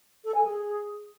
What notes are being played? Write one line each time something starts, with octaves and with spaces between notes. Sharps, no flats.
A4
G#5
G#4